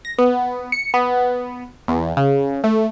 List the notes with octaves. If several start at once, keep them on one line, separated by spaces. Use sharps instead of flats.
A#6
B3
C#7
B3
E2
C#3
A3